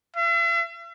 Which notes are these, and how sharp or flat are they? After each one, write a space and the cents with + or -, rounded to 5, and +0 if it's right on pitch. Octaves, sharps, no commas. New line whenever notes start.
E5 +45